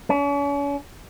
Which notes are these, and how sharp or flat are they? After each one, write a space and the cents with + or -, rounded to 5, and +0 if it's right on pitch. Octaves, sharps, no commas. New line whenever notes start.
C#4 +40